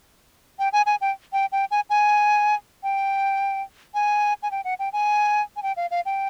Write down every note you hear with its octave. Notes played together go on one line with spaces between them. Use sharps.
G5
G#5
G#5
G5
G5
G5
G#5
G#5
G5
G#5
G#5
G5
F#5
G5
G#5
G#5
G5
F5
F5
G5